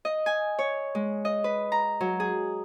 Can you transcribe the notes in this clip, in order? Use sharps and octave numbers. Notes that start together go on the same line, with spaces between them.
D#5
G#5
C#5
G#3
D#5
B4
A#5
F#3
G#4